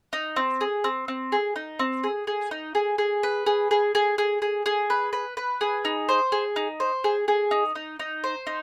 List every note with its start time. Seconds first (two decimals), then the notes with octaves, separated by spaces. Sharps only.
0.13 D#4
0.36 C4
0.61 G#4
0.84 C4
1.08 C4
1.32 G#4
1.56 D#4
1.79 C4
2.04 G#4
2.27 G#4
2.51 D#4
2.75 G#4
2.98 G#4
3.23 B4
3.46 G#4
3.71 G#4
3.95 G#4
4.18 G#4
4.42 G#4
4.66 G#4
4.90 B4
5.13 B4
5.37 B4
5.61 G#4
5.85 D#4
6.09 C5
6.32 G#4
6.56 D#4
6.80 C5
7.04 G#4
7.28 G#4
7.51 D#4
7.75 D#4
7.99 D#4
8.24 C5
8.47 D#4